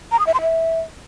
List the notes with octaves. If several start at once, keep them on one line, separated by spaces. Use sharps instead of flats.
A#5
D#6
E5
C6
E5